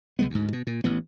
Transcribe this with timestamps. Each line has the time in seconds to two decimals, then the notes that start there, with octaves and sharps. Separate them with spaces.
0.19 C2 G3 G#3 B3
0.30 D2 G#2
0.53 B2
0.67 A#2
0.84 A1 E3 B3